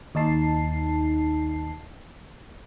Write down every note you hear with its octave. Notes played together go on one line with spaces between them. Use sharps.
D#2 D#4 A5 C7